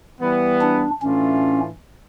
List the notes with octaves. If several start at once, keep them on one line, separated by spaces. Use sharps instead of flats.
E3 G3 B3
D4
A2 E3 A3 C#4 D4 F4